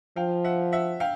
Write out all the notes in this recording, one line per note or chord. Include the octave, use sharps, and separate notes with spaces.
F3 F5 G5
E5 F#5
E5 F#5
F5 G5